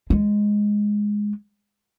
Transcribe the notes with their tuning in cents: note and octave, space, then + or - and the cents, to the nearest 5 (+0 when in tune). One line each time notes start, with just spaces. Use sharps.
G#3 +0